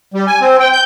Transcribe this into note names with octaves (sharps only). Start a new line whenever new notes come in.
G3
G#5
C4
G5
G6